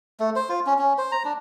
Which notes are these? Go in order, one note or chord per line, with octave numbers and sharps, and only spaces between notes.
A3
C5
F4
C#4
C#4
C5
A#5
D4